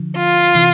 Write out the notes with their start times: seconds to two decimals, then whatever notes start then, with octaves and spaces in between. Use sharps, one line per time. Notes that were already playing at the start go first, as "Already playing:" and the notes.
Already playing: D3 F3
0.17 F4
0.55 C3 E3